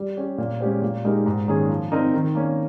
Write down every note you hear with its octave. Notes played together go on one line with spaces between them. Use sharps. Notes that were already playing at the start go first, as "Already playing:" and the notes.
Already playing: G3
C#4 G4
A#2
G#3 C#4 G4 C5
A#2
G#3 D#4 G4 A#4
G#2
D#3 A#3 C#4 G#4
F3
C4 D#4 A#4
D#3
A#3 C#4